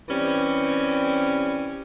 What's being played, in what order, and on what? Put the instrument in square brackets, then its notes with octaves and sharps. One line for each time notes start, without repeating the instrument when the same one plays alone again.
[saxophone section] E3 G3 C4 C#4